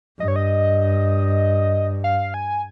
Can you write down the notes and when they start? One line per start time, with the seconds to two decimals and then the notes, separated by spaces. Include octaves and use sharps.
0.20 G2 D#5
0.28 C#5
0.36 D#5
2.04 F5
2.34 G#5